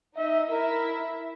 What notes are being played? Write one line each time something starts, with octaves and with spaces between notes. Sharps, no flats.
D#4 D#5 E5
E4 A#4 E5